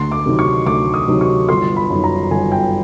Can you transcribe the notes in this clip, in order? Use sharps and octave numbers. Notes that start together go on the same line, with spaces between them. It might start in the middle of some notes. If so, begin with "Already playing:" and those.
Already playing: D2 C6
D6
C3 D#3 F#3
C#6
D2 D6
D#6
C3 D#3 F#3
C#6
G1 C6
B5
F#2 D#3
A#5
G1 G#5
G5